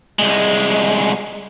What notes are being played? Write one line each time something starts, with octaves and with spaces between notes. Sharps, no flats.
C2 G#3